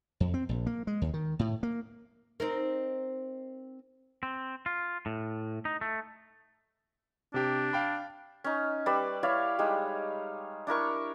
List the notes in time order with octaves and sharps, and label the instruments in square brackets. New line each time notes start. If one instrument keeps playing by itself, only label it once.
[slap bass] F2
C4
A#1
A#3
G#3
D#2
D#3
A2
A#3
[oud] C4 D#4 A#4
[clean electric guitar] C4
F4
A2
D#4
A3
[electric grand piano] C3 G4 [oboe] D4
[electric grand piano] F5 G5 B5
[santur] C#4 D#4
G3 B4 D5 E6
E4 C#5 D5 F5
G3 G#3 D#4
D4 E4 A#4 C#6